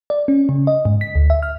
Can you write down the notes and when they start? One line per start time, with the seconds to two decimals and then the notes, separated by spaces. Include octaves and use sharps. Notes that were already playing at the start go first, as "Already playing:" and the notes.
0.10 D5
0.28 C#4
0.49 C#3
0.67 D#5
0.85 G#2
1.01 B6
1.15 D2
1.30 E5
1.43 F6